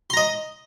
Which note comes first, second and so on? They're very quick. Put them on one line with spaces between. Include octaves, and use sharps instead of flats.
C6 A#5 D#5